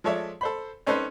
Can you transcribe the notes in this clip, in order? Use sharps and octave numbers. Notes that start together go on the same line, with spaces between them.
F3 G#3 A4 C#5 D5 E5
A4 C5 B5
C4 C#4 D#4 A4 B4 C5